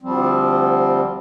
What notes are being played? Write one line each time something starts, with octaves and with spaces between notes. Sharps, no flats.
D2 F3 G3 C4